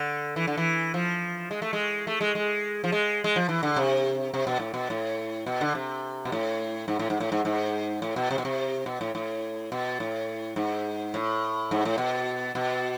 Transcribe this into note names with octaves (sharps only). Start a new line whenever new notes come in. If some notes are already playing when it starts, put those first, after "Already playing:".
Already playing: D3
E3
D3
E3
F3
G#3
A3
G#3
A3
G#3
G#3
F3
G#3
G#3
F3
E3
D3
C3
C3
B2
A2
B2
A2
B2
D3
C3
B2
A2
G#2
A2
G#2
A2
G#2
G#2
A2
B2
C3
B2
C3
B2
A2
A2
B2
A2
G#2
A2
G#2
A2
B2
B2